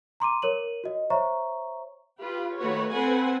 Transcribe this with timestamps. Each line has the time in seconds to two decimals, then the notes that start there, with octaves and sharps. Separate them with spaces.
0.20 A#5 C6 D6 D#7
0.42 A#4 C#5 D#7 F#7
0.84 F#4 D#5
1.10 C5 C#5 E5 A#5 C#6
2.20 F4 G4 B4
2.58 D#3 A3 F#4 B4 C#5
2.93 C4 A4 B4 F#5 G#5